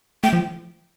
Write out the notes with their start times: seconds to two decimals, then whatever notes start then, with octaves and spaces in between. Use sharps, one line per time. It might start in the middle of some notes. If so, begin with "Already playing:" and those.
0.23 A3 G5
0.33 F3